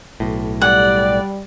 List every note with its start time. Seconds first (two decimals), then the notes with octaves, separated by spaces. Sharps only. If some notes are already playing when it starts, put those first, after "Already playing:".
0.20 B1 A2
0.61 G3 D5 F#5